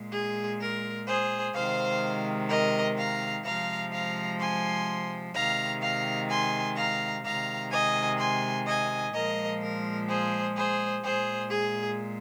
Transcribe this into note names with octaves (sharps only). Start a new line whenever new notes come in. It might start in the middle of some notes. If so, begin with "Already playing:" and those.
Already playing: A#2 G#3
G#4
A#4
G#4 C5
C3 D#3 G#3 C5 F5
A#4 D#5
F5 A#5
C3 F3 G#3 F5 A#5
F5 A#5
G#5 C6
C3 D#3 G#3 F5 A#5
F5 A#5
G#5 C6
F5 A#5
C3 D#3 G#3 F5 A#5
D#5 G#5
G#5 C6
D#5 G#5
A#2 F3 G#3 A#4 D#5
A#4
G#4 C5
G#4 C5
A#2 G#3 G#4 C5
G#4